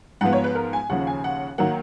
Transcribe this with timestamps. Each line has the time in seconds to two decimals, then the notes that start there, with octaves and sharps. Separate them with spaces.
0.21 G#2 F3 B3 F#5
0.33 C#5
0.44 B4
0.55 A#4
0.73 G#5
0.89 D#2 C#3 F3 F#5
1.07 G#5
1.24 F#5
1.58 D#3 F#3 A#3 F#5